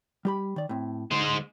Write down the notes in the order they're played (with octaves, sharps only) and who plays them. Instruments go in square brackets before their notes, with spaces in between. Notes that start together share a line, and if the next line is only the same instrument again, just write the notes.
[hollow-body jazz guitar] G3 G4 B5
D#3 D5
A2 C4
[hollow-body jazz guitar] D2 [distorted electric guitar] G#3 C5